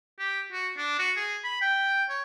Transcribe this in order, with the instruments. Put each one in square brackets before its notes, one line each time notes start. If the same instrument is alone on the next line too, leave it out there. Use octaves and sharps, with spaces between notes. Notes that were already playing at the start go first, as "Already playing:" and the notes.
[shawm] G4
F#4
D4
F#4
G#4
B5
G5
C#5